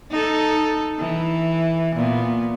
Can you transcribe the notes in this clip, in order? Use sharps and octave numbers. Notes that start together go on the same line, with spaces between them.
D#4 A4
E3
A#2 B3